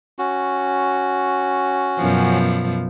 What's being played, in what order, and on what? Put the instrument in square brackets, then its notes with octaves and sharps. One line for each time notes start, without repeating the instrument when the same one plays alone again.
[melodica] C#4 F#4
[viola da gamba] F#2 B2 F3